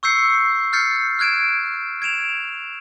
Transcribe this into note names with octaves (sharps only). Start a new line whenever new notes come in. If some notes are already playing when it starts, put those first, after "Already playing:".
C#6 E6 G6 C7 C#7
F6 G6 A6 C7 C#7
F6 F#6 G#6 D7 E7
G#6 D7 E7 F7